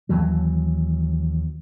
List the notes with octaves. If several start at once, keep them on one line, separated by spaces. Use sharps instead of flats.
D#2 E3 F#3